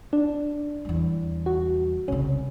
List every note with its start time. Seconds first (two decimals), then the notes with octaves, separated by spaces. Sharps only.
0.13 D4
0.85 E2 G3
1.46 F#4
2.08 C2 C#3 C#4